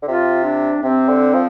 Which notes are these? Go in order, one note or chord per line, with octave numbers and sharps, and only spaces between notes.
D3
C3 F4
D4
C3 C4
D3
F3